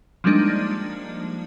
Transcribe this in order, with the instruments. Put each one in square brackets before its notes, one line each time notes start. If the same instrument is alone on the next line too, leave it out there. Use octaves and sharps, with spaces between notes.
[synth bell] F3 G3 G#3 A#3 D4 D#4